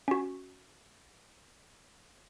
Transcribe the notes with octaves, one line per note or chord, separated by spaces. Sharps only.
C#4 F#4